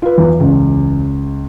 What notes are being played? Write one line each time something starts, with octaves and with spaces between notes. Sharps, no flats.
F4 B4
E2
C#2